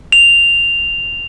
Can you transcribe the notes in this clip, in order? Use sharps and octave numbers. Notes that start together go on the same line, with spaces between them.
F7